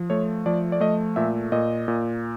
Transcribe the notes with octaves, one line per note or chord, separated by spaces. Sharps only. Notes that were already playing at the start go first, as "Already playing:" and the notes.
Already playing: F3
A3 C#5
F3 D5
D5
A3 D#5
A#2 E5
A#2 D#5
A#2